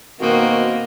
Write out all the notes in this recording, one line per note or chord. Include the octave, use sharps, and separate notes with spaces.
B2 D#3 A#3 C4 F#4